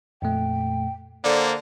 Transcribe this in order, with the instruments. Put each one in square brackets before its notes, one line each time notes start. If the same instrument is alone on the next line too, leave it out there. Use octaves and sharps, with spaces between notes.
[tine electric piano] F2 A#2 A3 [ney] G5
[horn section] D3 [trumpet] A#3 [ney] C5 [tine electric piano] D5